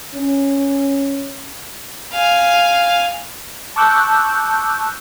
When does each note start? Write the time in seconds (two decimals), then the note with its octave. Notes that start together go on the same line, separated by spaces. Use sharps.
0.14 C#4
2.13 F5 G#5
3.76 A5 C#6 D6 E6 F#6 G6